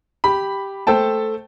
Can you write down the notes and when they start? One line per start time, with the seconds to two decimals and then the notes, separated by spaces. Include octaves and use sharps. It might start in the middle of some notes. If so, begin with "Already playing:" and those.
0.24 G4 B5
0.87 A3 A4 C5 G5 A5